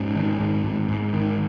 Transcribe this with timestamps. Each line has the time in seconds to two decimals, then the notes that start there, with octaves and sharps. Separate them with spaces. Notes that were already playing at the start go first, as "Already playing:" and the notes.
Already playing: G#2 C#4
0.16 D#3
0.40 G#2
0.64 G#2
0.88 G#2
1.13 D#3